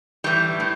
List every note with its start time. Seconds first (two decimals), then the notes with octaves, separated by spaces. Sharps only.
0.24 A2 E3 G3
0.60 A2